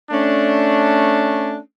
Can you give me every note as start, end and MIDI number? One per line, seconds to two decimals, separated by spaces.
0.11 1.57 57
0.11 1.57 61
0.11 1.57 62